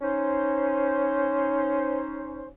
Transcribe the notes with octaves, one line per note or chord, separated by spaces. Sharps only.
C#4 D#4 C5